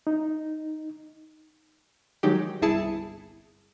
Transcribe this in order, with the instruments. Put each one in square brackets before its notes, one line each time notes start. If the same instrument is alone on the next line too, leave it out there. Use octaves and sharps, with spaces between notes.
[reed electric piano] D#4
[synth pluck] D#3 F#3 G#3 D#4 G4
G1 C2 E4 G#4 A5 C#7